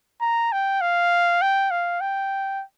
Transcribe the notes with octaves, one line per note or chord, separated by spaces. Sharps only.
A#5
G5
F5
G5
F5
G5